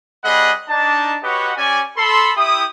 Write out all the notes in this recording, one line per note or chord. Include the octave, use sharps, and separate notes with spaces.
G3 C4 G#4 D#5 F#5 B5
D4 D#4 A5
F#4 G4 B4 C#5 D#5 F#5
C#4 G4 D5 G#5
A4 B5 C6
E4 G4 D#6